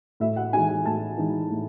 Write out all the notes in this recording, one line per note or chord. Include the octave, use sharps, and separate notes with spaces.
A2 E5
F#5
E3 G#3 D#4 G#5
G#5
A2 A5
E3 G#3 D#4
A2